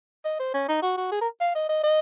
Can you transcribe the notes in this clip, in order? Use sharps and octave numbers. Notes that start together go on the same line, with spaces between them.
D#5
C5
C#4
D#4
F#4
F#4
G#4
A#4
F5
D#5
D#5
D#5